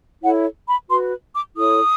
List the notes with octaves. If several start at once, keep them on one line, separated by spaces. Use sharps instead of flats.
E4 A4 C#5 F#5
B5
F#4 B4 C6
D6
E4 A4 C#5 D#6